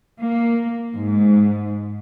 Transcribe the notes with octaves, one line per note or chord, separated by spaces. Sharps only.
A#3
G#2